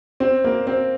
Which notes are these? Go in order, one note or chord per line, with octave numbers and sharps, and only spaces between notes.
C4
A#3
C4